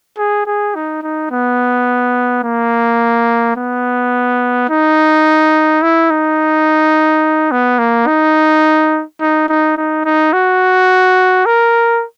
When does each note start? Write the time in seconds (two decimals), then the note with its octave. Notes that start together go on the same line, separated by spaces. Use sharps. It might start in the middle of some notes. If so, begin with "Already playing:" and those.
0.18 G#4
0.46 G#4
0.75 D#4
1.02 D#4
1.31 B3
2.43 A#3
3.56 B3
4.69 D#4
5.82 E4
6.10 D#4
7.51 B3
7.79 A#3
8.07 D#4
9.20 D#4
9.48 D#4
9.77 D#4
10.05 D#4
10.33 F#4
11.46 A#4